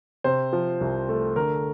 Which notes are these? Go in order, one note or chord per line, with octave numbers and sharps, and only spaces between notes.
C3 C5
F3
C2
A3
D3 A#4